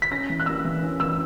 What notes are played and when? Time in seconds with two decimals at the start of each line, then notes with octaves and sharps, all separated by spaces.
0.02 B6
0.11 C#4 A#6
0.29 E3
0.40 F#6
0.46 A#3 E6
0.65 E3
0.83 C#4
1.00 E3 E6